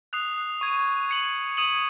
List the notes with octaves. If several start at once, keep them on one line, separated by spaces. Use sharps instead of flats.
D#6 F#6 C7 F7
C#6 G#6 D#7
G#6 C#7 F#7
D#6 G#6 D#7 F#7